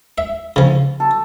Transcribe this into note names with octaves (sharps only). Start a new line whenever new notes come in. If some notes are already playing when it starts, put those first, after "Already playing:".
E5
C#3 F3
A4